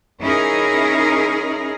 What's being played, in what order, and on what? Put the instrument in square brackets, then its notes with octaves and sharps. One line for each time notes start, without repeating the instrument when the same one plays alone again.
[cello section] C#4 D#4 E4 G#4 A#4